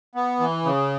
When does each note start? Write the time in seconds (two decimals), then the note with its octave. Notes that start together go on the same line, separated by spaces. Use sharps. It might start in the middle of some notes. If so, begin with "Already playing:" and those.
0.15 B3
0.40 E3
0.64 C#3